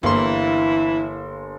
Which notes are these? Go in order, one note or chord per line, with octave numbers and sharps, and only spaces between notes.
G1 E3 A#3 E4 C5 C6